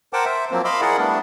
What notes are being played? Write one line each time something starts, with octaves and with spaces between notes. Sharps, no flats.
A#4 C5 F#5 G5 A5 D6
C5 E5
F3 F#3 A#3 C4
D#5 F5 B5 C6 D6 E6
E4 G#4 A#4 D5 F#5
G3 A3 B3 D4